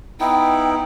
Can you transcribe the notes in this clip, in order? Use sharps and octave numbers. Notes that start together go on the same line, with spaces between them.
B3 D#4 E4 G5